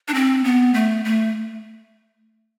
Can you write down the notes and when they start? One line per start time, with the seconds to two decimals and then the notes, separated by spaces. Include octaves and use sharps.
0.08 D4
0.14 C4
0.44 B3
0.74 A3
1.05 A3